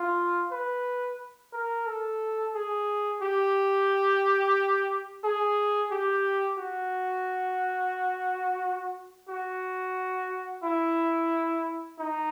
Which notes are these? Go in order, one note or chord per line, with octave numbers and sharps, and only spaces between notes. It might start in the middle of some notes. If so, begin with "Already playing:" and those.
Already playing: F4
B4
A#4
A4
G#4
G4
G#4
G4
F#4
F#4
E4
D#4